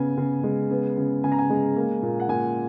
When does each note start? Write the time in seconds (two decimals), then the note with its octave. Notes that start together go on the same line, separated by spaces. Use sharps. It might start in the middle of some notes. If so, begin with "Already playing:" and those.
Already playing: C#3 B3 G#5
0.17 C#3
0.43 G#3
0.71 B3
0.97 C#3
1.24 C#3 G#5
1.32 A#5
1.38 G#5
1.50 G#3
1.76 A#3
2.02 A#2
2.20 F#5
2.29 A#2 G#5